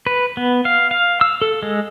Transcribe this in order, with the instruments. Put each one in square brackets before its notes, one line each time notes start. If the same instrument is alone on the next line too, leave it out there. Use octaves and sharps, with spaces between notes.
[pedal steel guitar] B4
B3
F5
F5
E6
A4
G#3